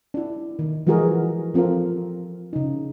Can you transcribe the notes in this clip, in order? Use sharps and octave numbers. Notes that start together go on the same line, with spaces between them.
D4 E4
D#3
E3 F3 G#3 F#4 G#4 A#4
F3 C4 F4 A4 A#4
C#3 D#4